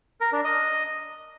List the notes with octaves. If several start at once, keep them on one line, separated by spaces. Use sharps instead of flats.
A#4
D4
D#5